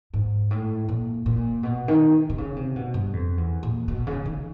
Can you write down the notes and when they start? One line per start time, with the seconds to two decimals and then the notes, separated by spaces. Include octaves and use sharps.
0.14 G#2
0.51 A2
0.88 A#2
1.26 A#2
1.63 B2
1.88 D#3
2.30 C3
2.38 C#3
2.56 C3
2.76 B2
2.94 G2
3.13 F2
3.38 E2
3.63 A#2
3.88 B2
4.07 C#3
4.25 D#3